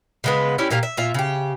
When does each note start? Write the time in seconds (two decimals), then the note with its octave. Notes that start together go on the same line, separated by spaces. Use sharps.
0.24 C#3 G#3 B3
0.58 C#4 D4 E4 G4
0.70 A#2 A#3 G4 F5
0.83 E5
0.97 A#2 F4 E5
1.14 C#3 G4